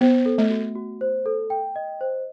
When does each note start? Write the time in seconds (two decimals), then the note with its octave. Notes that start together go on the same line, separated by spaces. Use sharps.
0.01 B3 C5
0.26 A4
0.38 A3
0.50 F#4
0.75 F#4
1.01 C5
1.26 A4
1.50 G5
1.76 D#5
2.01 C5